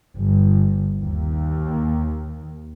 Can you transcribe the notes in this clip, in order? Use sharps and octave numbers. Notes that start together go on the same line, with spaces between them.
G1
D#2